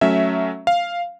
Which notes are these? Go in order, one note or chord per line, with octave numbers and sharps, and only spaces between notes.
F#3 A3 C#4 E5
F5